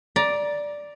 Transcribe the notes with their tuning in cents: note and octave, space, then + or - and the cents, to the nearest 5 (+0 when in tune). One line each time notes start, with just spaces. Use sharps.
D5 +0 A#5 +25